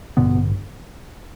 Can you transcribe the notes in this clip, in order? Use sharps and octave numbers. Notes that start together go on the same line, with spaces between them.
A1 G2 B2 D3 B3